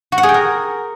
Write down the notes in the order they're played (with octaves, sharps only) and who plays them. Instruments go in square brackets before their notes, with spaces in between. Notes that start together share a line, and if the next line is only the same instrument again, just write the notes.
[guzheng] F#4
F#5
G#4
G5
A#4